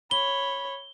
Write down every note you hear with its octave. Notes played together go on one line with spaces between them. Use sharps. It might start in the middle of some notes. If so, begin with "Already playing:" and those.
C#5 B5 G7